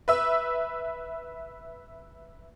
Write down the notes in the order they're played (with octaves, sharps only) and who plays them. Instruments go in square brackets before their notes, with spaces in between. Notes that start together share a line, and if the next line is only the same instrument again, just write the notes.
[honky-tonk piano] B4 E5 E6